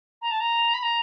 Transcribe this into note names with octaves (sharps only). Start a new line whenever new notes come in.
A#5
A5
A#5
B5
A#5